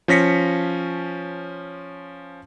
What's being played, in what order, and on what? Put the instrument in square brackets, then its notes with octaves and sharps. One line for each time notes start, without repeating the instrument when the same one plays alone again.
[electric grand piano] F3 C#4 A#6 B6 C#7